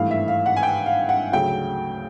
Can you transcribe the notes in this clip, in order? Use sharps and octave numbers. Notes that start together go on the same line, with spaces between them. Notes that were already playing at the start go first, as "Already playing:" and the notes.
Already playing: G#1 G2 E3 A3 F5
E5
F5
F#5
G#5
G5
F5
F#5
D2 C#3 F#3 A3 G5